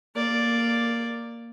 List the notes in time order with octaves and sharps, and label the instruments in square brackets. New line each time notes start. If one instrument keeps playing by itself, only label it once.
[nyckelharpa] A#3 D5